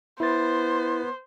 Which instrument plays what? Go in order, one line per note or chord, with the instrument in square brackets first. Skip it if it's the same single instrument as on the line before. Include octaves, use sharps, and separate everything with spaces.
[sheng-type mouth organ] B3 [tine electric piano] E4 A6 [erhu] C5